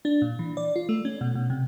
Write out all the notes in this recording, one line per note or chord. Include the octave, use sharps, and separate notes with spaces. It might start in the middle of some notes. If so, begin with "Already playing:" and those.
D4
A#2
E3
D5
F4
A3
C#4
B2
B2
C3